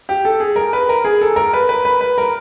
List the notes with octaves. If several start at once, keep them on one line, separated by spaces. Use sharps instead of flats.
G4
A4
G#4
A#4
B4
A#4
G#4
A4
A#4
B4
B4
B4
B4
A#4